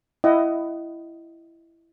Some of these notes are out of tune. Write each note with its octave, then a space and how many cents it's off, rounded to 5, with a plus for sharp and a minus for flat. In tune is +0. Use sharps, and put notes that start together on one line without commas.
E4 +10 D#5 +0 F#5 +35